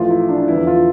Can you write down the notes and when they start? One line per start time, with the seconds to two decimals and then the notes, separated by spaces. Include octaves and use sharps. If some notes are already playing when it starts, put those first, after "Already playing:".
Already playing: A1 A2 F3 F4
0.10 E4
0.29 D4
0.48 E2 D3 F3 E4
0.67 F4